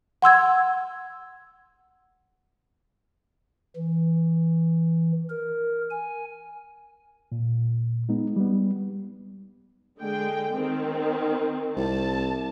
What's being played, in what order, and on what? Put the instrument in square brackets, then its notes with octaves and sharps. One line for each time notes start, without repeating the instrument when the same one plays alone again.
[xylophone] F#5 C6 E6 G#6
[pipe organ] E3
A#4
G#5
[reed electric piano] A#2
G#3 B3 D#4
G3 B3
[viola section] D3 G#3 G5
D#3 C4
[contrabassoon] C2 [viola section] A5